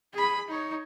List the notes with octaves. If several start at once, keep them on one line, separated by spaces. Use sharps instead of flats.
G#4 B5
D#4 C#5